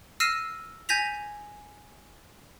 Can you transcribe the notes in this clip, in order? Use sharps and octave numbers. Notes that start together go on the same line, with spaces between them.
E6 F6 A#6 C7 D#7 E7
G#5 G6 G#6 A#6 B6 F7